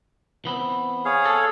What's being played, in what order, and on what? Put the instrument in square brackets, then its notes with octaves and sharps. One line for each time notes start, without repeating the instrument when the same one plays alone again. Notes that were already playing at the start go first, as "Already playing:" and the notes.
[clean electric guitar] E3 B3 C4
[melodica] G#4 C#5 F5
[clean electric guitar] A4